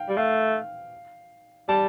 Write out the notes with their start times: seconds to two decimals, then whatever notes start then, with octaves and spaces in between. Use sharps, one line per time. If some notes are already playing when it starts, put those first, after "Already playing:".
Already playing: F5 G5
0.09 G3
0.17 A3 F5
1.69 G3 A5